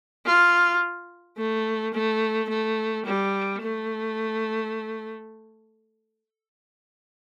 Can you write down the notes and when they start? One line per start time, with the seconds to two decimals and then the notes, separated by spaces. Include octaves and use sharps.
0.26 F4
1.38 A3
1.94 A3
2.49 A3
3.05 G3
3.61 A3